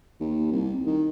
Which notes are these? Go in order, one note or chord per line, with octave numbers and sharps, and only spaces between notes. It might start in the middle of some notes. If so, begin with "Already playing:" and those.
D#2
C2
D#3